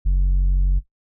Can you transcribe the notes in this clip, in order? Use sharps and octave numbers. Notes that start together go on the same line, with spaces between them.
F#1